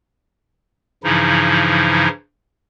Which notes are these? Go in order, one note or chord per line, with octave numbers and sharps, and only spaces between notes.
G2 C#3 E3 F3 D#4 E4